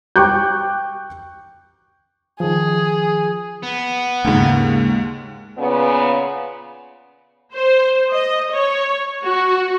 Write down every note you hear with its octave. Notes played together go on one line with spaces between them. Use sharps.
G5 C#6 D6 F#6 G6
D#3 F3 G#4
B3
D#2 G#2 C#3 A#3
A#2 C#3 B3
C5
D#5
C#5
F#4